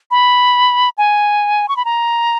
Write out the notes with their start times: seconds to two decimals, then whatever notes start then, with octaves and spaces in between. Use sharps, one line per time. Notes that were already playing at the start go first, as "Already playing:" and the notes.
0.11 B5
0.98 G#5
1.68 C#6
1.77 B5
1.85 A#5